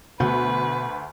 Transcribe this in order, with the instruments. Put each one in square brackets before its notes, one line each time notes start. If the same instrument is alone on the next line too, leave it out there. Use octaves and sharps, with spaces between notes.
[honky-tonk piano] D2 [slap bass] B2 B3 [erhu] B4